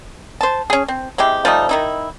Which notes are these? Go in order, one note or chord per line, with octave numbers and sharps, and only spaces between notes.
C5 A5
C#4 G#4
C4
C3 G#3 E4 G4
F3 G3 A3 D#4
D#3 D#4 E4